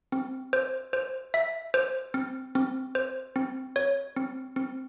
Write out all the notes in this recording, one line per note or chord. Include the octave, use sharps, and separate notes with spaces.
C4
C5
C5
E5
C5
C4
C4
C5
C4
C#5
C4
C4